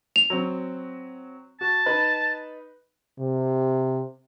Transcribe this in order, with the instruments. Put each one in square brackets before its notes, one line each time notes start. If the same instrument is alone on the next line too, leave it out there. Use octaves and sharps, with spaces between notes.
[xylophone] F7
[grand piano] F#3 C4
[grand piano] F#4 [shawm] A5
[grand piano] D#4 B4
[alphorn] C3